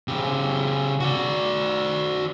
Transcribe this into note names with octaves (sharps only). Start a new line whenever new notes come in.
C#3 G4
F#4 D5